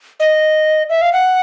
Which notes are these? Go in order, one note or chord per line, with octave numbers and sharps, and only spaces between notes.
D#5
E5
F5
F#5